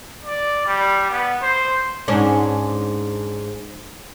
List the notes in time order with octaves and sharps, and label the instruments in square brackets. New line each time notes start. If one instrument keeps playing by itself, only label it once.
[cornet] D5
G3
B3
C5
[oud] G#2 C#4 D4